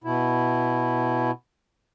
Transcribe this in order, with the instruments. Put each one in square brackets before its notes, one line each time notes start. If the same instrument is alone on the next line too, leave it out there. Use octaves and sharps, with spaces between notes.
[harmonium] B2 E4